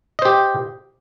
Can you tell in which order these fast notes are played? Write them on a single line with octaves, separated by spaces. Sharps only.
D#5 C5 G4